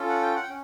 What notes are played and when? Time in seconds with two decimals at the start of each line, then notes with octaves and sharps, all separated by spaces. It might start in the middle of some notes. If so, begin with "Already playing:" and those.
Already playing: C#4 F4 A4
0.08 F#5
0.22 G5
0.35 F#5
0.43 G5
0.49 C#4